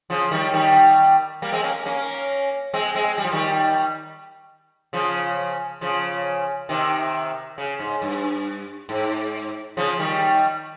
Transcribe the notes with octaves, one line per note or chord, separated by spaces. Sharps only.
C#3 F3
D#3 G3
D#3 G3
G3 A#3
G#3 C4
A#3 C#4
A#3 C#4
G#3 C4
G#3 C4
G3
F3
D#3 G3
C#3 F3
C#3 F3
C3 D#3
C#3
G#2
G2
G#2
C#3 F3
D#3 G3